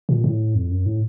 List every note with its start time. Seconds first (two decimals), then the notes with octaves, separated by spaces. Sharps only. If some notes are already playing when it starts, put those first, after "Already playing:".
0.09 A#2
0.24 A2
0.55 F2
0.71 F#2
0.86 A2